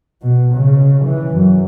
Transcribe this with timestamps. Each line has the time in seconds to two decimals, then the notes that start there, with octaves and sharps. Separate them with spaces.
0.22 B2
0.54 C#3
1.05 E3
1.35 F#2